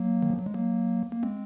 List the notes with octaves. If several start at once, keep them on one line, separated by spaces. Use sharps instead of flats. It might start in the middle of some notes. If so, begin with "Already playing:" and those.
Already playing: F#3 A#3
D#3
F3
F#3
G#3
F#3 A#3
A#3
G#3 C4